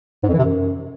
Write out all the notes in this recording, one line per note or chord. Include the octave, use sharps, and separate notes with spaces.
G#2
F2
E3
C3
F#2